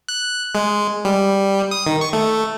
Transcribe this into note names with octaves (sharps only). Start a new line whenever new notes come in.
F#6
G#3
G3
D#6
D#3
C#6
A3